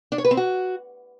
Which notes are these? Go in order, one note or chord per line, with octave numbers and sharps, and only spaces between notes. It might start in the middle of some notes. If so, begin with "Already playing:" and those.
D4
C#5
B4
C4
F#4